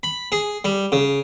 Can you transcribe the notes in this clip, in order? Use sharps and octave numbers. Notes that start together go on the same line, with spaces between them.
B5
G#4
G3
C#3